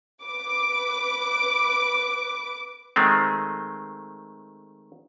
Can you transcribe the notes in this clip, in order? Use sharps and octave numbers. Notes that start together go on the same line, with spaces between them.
B4 D6
D#3 G#3 A3 C4